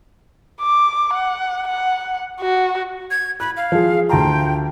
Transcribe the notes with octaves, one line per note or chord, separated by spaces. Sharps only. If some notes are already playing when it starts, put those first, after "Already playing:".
D6
F#5
F#5
F#4
G#6
B5 F#6
F5
F3 G#4
D2 G5 A5 A#5